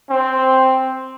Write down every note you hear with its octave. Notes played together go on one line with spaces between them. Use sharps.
C4